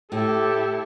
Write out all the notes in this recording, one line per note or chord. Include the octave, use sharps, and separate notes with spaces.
A2 E4 G4 A4